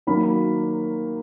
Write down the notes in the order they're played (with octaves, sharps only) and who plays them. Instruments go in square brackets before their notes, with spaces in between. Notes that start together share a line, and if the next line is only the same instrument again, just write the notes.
[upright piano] D#3 F#3 A#3 B5